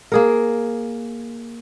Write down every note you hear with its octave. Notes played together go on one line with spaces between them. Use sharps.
A#3 G#4 A#4